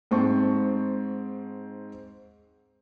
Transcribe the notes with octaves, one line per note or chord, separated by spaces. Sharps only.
G#2 C4 A5 C#6